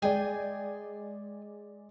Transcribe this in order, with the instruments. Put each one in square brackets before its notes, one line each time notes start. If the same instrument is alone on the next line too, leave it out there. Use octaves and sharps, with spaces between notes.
[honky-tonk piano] G#3 D5 [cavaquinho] G#4 G5 G#5